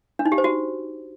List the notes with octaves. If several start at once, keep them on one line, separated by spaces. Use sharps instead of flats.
D4
D#4
G4
C5
F#4